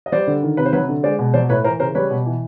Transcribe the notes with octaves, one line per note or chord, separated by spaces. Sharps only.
D#5
G3 C5 D5
D3
D#3
C3 B4
C5
F#3 B4 C#5
D3
G#3 C5 D5
B2
F#3 C5 D5
A2 B4 C#5
E3 A#4 C5
C#3 A#4 C5
G3 B4 C#5
B2
E3